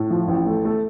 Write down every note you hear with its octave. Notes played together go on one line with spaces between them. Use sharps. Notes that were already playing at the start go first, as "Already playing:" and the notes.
Already playing: A2
F3
A1
A3
A3